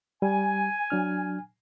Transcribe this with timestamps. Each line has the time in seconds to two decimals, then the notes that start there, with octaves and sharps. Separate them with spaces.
0.22 G3 G#5
0.90 F#3 D4 F6